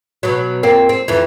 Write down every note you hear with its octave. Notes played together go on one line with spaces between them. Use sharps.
B2 F#3
F2 A#3 C4
C4
F2 E3